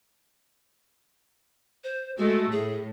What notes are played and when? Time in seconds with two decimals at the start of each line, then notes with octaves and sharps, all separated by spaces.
1.84 C5
2.17 G#3 A3 F#4
2.52 A2 G#4